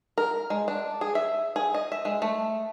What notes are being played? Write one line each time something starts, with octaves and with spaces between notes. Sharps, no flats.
A#4
G#3
D4
G#4
E5
G#4
D#5
E5
G#3
A3